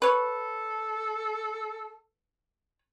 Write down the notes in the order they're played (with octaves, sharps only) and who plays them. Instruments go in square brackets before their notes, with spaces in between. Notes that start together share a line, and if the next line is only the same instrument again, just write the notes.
[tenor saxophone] A4 [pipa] B4 C#5